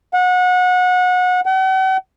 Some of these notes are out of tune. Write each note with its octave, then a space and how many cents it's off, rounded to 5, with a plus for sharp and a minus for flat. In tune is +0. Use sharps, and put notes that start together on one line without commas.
F#5 -25
F#5 +45